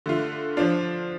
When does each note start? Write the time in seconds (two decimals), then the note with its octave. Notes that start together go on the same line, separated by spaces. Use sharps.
0.06 D3 A3 F4
0.57 F3 D4 F4